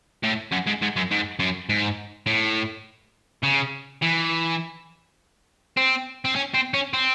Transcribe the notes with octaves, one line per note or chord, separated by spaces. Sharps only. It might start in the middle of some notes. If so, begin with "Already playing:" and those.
A2
F#2
G#2
G#2
F#2
G#2
F#2
G#2
A2
C#3
E3
C4
C4
C#4
C4
C#4
C4